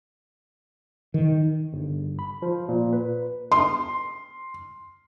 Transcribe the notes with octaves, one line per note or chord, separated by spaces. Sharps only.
D#3
G1
B5
F3
A#2
B4
C6